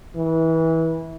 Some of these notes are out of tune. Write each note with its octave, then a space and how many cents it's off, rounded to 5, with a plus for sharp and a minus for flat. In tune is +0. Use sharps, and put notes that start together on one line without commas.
E3 -25